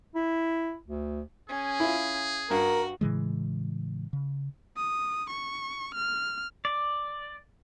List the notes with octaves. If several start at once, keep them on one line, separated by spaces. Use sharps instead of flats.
E4
D2
C#4 G#4
E4 F4
G2 F#4 A#4
A2 C#3 E3 G#3
C#3
D#6
C#6
F6
D5